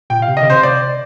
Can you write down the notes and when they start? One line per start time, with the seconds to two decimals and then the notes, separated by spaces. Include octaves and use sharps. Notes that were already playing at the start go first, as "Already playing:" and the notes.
0.10 A#2 G5
0.22 F5
0.27 C3
0.37 D#5
0.41 D3
0.46 C3 C5
0.63 D5